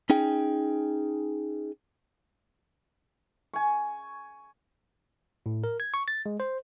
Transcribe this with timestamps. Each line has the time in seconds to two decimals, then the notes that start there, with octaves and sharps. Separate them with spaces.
0.10 C#4 D#4 G#4 G5
3.54 G#5 C#6
5.46 A2
5.64 A#4
5.80 G#6
5.94 C#6
6.08 A6
6.26 G#3
6.40 C5